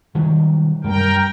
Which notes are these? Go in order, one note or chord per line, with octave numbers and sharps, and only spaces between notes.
D#3 F#3 G3
F#2 G3 A#4 G5